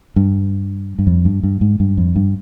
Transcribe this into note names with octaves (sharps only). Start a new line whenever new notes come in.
G2
G2
F2
G2
G2
G#2
G2
F2
G2